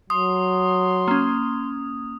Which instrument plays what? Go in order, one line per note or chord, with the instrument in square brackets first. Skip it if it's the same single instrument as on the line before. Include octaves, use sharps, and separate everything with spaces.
[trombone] F#3 [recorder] C6 [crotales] D#6
[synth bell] A#3 C#4